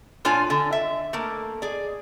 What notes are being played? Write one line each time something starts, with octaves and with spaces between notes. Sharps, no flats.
A#2 D4 F4 C#5 G#5
D3
E5
A3 A#3
G#4 D5